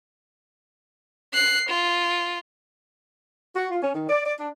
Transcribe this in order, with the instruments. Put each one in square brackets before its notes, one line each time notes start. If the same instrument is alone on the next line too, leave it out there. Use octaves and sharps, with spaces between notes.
[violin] F#6 C7
F4
[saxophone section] F#4
F4
C#4
D#3
D5
D5
D4